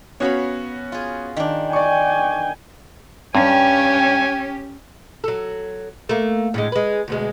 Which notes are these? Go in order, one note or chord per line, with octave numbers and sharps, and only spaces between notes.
B3 C#4 F#4 C#5 F5 B5
F4 G#4
D#3 D4
D5 G5 G#5 C#6
G2 C#4 G4 C#5 G5 G#5
F#3 A4
A3 A#3
A2 D3 G#3
G#3 B4
D2 B2 G#3